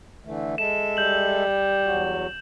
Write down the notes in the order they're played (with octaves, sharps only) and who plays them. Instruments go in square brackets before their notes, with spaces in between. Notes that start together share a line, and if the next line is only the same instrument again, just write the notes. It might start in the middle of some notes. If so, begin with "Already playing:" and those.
[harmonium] D3 E3 A3
[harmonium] G#3 A4 E5 [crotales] E7
[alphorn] G3 [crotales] G6 F#7
[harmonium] E2 F#3 F#4